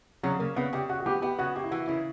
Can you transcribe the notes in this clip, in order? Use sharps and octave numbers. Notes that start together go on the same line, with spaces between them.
C#3 F#3
C#3 A#3
C#3 B3
C#3 G4
C#3 F#4
F#4
B3 G4
B3 G4
C#3 F#4
A#3 G4
E4
E3 F#4
C#3 E4